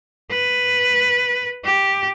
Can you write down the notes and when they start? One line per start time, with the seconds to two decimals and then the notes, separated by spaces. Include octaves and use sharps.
0.31 B4
1.65 G4